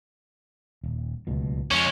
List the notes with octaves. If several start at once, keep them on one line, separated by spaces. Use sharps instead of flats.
D#1
D1 C#2 B2
F2 G#3 C#4